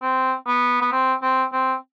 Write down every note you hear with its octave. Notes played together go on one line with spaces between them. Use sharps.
C4
B3
B3
C4
C4
C4